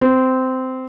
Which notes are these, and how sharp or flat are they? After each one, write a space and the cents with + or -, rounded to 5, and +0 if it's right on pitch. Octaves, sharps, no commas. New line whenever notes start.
C4 -15